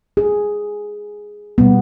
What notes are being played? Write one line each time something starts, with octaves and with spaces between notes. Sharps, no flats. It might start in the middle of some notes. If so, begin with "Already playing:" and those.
G#4
B2 G3 B3